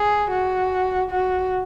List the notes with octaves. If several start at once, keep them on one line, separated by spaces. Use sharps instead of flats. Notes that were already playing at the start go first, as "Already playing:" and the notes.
Already playing: G#4
F#4
F#4